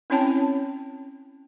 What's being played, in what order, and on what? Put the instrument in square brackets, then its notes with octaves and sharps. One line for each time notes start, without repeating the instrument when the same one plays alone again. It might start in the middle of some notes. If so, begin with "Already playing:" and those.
[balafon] C4 C#4 E4 C#5 G5 A5